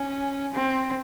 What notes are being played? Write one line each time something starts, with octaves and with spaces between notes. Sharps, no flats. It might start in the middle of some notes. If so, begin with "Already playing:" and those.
Already playing: C#4
C4